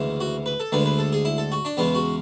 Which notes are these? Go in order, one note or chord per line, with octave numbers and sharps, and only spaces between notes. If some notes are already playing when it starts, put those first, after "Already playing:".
Already playing: D2 C#3 E3 G#3
F#4
B4
A4
D2 D3 G#3 B4
B4
A4
G#4
E4
A4
F#4
D4
E2 C#3 G#3 B3
F#4